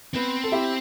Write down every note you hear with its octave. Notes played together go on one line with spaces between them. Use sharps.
B3 C4
A4
E4 G4